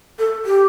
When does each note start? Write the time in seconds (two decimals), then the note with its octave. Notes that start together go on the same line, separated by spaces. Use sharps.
0.19 A4
0.46 G4